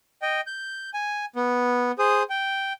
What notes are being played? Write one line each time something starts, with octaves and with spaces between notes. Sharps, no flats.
D#5 G5
G6
G#5
B3
G#4 C5 D#6
G5